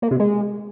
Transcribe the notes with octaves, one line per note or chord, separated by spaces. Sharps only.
A#3
C3
G#3